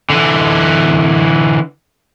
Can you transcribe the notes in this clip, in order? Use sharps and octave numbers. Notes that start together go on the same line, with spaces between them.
D3 E3